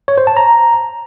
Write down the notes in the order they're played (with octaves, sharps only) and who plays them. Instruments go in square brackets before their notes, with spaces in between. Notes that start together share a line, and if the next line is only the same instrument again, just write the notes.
[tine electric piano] C#5
C5
A5
A#5